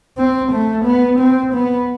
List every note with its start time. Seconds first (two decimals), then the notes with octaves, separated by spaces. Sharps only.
0.18 C4
0.52 A3
0.85 B3
1.19 C4
1.54 B3